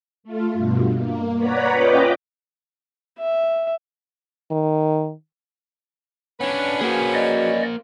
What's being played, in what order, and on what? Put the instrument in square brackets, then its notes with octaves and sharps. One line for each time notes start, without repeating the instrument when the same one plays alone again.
[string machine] A3 F4
G2 B2
A#3
B4 C#5 D5 F#5 A#5 B5
C#4 F4 B4 D#5 G5 D6
[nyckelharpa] E5
[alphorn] D#3
[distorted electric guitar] B3 D4 [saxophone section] C#4 B4 C#5
[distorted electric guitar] A#3 C5 [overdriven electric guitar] F#4 G#4
[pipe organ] D5 D#5